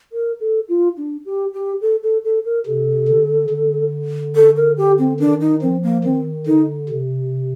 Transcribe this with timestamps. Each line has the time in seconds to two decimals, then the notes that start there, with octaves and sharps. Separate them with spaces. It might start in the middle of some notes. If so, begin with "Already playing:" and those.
0.12 A#4
0.40 A4
0.69 F4
0.97 D4
1.25 G4
1.54 G4
1.81 A4
2.03 A4
2.24 A4
2.45 A#4
2.66 C3 A4
3.08 D3
3.50 D3
4.35 A4
4.56 A#4
4.77 G4
4.99 C4
5.20 D#3 D4
5.41 D#4
5.62 F3 C4
5.83 A#3
6.04 D#3 C4
6.47 D3 D#4
6.89 C3